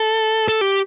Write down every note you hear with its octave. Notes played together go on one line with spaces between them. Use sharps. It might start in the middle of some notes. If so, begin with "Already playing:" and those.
Already playing: A4
A4
G4